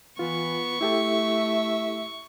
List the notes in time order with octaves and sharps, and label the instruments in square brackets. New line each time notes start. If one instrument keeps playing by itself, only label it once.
[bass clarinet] E3 [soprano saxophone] B3 [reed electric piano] F4 [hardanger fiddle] C#6
[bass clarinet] A3 [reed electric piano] E4 G4 A4 [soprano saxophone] E5